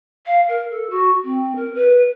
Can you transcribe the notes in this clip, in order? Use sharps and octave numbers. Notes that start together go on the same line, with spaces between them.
F5
A#4
A4
F#4
C4
A#4
B4